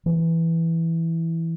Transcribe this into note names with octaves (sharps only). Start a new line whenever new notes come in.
E3